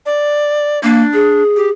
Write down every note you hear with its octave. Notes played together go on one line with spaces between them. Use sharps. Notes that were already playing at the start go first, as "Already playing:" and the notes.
D5
A#3 D4
G#4
G4